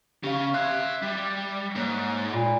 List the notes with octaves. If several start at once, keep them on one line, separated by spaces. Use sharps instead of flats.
C#3 C#4 G4 F5
E5 C6 F#6 G#6
G3
G#2 A#3 C#5 F#6
A#2 B5